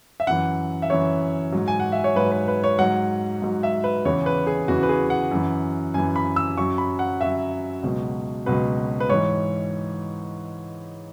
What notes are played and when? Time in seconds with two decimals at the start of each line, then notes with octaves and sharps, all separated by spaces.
0.20 E5
0.27 F#2 E3 F#5
0.82 E5
0.90 F#2 E3 C#5
1.52 G#2 F#3
1.68 G#5
1.80 F#5
1.92 E5
2.04 C#5
2.15 G#2 F#3 B4
2.32 B4
2.48 B4
2.64 C#5
2.79 G#2 F#3 F#5
3.42 G#2 F#3
3.63 E5
3.84 B4
4.05 E2 C#3 E3 C#5
4.26 B4
4.47 G#4
4.68 E2 C#3 E3 F#4
4.83 B4
4.89 G#4
5.10 F#5
5.31 F#2 E3
5.94 F#2 E3 G#5
6.16 B5
6.36 E6
6.57 F#2 F#3 C#6
6.78 B5
6.99 F#5
7.20 F#2 F#3 E5
7.83 C#2 B2 F#3
8.46 C#2 B2 F#3 B4
9.00 B4
9.09 G#2 E3 C#5